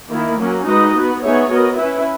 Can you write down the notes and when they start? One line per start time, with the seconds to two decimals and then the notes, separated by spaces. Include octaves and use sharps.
0.09 D#3 A#3 E4
0.38 F#3 A#3 C#4
0.66 G#3 D#4 F#4 B4 D#5
0.94 B3 F#4 B4
1.22 B3 D#4 G#4 C#5 E5
1.50 B3 F#4 A#4 D#5
1.78 C#4 E4 B4 E5